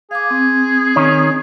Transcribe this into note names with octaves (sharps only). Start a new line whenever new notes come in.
G#4 F5 D6
C4
D#3 C#4 D#4